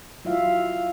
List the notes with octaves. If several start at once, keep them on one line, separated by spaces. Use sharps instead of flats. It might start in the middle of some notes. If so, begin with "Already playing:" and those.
F#3 E4 F4 E5 F5